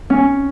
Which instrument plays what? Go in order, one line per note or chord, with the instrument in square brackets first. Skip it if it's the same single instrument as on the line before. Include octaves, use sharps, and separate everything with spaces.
[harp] C#4